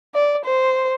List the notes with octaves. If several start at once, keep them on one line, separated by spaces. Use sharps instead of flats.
D5
C5